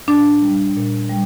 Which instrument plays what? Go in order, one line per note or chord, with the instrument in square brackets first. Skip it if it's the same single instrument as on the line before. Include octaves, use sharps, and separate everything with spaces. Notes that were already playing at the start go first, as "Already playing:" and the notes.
[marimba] A#2 D4
G3
A#2
G3